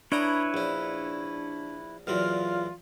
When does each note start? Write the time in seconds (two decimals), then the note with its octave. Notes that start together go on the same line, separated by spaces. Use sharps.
0.12 D4 E4 B4 C#5 G5 A#5 D#6
0.54 A#1 C#4
2.07 E2 A#2 F#3 F4 F6